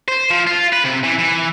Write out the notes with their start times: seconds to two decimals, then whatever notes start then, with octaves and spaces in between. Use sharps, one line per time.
0.08 C5
0.30 F3
0.47 F4
0.72 B4
0.84 C3
1.03 E3
1.18 E3